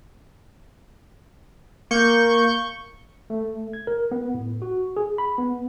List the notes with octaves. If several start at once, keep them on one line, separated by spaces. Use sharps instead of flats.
A#3 C#6 G6
A3
G#6
A#4
B3
A2
F#4
G#4
B5
B3